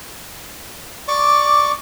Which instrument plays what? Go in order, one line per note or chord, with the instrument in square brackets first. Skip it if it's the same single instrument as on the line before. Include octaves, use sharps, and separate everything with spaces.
[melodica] D5 C#6 D6